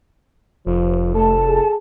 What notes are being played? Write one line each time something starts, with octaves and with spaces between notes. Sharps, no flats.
F1 F3
A3 A4 A5
G#4